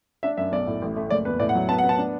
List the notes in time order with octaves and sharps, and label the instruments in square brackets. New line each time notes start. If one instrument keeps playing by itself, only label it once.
[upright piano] D4 E5
F#2 E5
B1 D5
A2
A1
A3
F#1 D5
E2 B4
A2 D5
F#5
F#3
B3 A5
F#5
B3
A5
D4